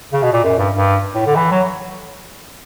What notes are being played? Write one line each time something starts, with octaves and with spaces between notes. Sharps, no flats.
C#3
B2
A#2
F#2
G2
G2
A2
D3
E3
F#3